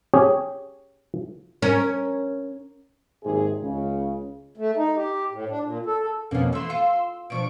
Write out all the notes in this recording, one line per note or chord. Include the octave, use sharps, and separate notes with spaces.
C#4 G4 G#4
C#4 A#4
G#1 D#2 G#2 C3 C4 G#4
C#2 C#3
A3
D#4
G4
A2
D4
A#2
A4
F2 B2 A#3 B3 C#4
E3 A3 C6 E6
F4
B2 F3 D4 C#6 D7